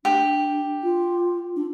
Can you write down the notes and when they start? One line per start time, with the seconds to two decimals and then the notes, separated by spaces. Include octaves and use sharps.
0.05 D4 G4
0.83 F4
1.56 D4